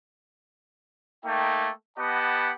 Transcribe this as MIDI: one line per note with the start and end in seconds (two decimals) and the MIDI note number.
1.25 1.70 57
1.25 1.70 58
1.25 1.70 63
1.25 1.70 79
1.99 2.52 59
1.99 2.52 67
1.99 2.52 75
1.99 2.52 78
1.99 2.52 81
1.99 2.52 83